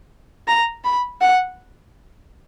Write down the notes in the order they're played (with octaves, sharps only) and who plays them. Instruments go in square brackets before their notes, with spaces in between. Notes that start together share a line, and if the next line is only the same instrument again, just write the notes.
[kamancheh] A#5
B5
F#5